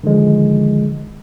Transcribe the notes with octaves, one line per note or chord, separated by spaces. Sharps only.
D3 D#3 F3 G#3